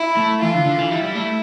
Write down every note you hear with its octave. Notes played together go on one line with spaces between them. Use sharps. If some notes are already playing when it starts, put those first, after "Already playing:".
Already playing: E4
A3
E3 F4
D3
D3
E3
G3 E4
G3
A3